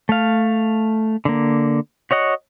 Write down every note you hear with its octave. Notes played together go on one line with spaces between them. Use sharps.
A3 F5
D3 A#3
F#4 C#5 D#5 F#5